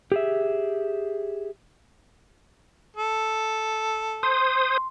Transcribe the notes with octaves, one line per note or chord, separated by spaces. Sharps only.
G4 G#4 E5
A4
C5 C6 D#6